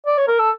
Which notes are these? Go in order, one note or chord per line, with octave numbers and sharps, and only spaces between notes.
D5
C#5
A#4
A4